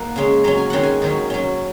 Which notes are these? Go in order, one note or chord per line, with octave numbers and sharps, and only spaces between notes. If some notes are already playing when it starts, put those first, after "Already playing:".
Already playing: A#3 F#5
C#3 G#3 C#4
F#3 C#4 A#5
G#5
D#3 G#3 C#4 F#5
G#5
D#3 F#3 C#4
F#3 C#4